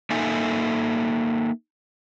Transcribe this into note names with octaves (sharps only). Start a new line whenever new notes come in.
A#3 D#4 A4 E5 G#5